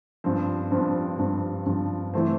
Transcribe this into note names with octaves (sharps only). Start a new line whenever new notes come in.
G2 F3 C4
G2 F3 C4
G2 F3 C4
G2 F3 C4
E3 A3 C4